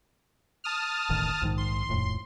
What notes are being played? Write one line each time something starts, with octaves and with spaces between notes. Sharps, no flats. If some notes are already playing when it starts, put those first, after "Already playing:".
A5 D#6 F6
E1 A1 D#3
A#1 G#2 D#3
C6
D#1 F2 A2